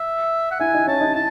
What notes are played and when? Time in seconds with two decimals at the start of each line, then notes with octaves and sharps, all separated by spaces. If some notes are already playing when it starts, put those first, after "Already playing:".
Already playing: E5
0.51 F#5
0.60 E4 E5 G#5
0.74 D#4 D#5
0.87 C#4 C#5 A5
1.01 D#4 D#5
1.14 E4 A5